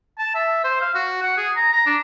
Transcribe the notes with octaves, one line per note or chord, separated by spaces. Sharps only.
A5
E5
C5
F5
F#4
F#5
G#4
A#5
A#5
D4